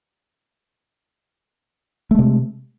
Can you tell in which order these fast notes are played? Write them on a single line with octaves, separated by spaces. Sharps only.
A3 G#3 C3